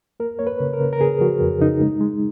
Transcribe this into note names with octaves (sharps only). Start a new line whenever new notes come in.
A#3 A#4
A#3 C#5
B4
C#3
A#4
C#3
A#4
C#3 G#4
F3 F#4
F2
C#3 D#4
G#3
G#3